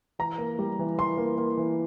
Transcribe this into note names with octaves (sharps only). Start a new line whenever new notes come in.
E3 A#5
A#3
G3
E3
E3 C6
A#3
A#3
E3